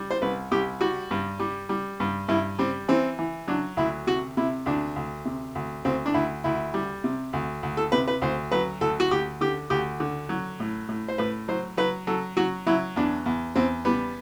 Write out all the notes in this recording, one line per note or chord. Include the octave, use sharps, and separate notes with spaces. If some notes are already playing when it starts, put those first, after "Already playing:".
Already playing: G3
C5
C2 B4
C2 G4
G3 F#4
G2
G3
G3
G2
G2 E4
G3 C4
E3 C4
E3
F#3 D4
D2 E4
C3 F#4
C3 E4
D2 D4
D2
C3
D2
D2 C4
D4
D2 E4
D2 E4
G3
C3
D2
D2
A4
C3 B4
B4
D2 C5
F#3 B4
D2 A4
F#4
D2 G4
D3 G4
D2 G4
D3
F#3
A2
A2
C5
A2 B4
F#3 C5
F#3 B4
F#3 A4
F#3 F#4
F#3 E4
E2 D4
E2
E2 C4
G3 B3